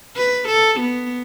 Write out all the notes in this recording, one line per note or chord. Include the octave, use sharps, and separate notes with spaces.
B4
A4
B3